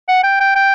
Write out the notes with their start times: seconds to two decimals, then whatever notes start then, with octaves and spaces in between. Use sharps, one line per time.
0.08 F#5
0.24 G5
0.40 G5
0.56 G5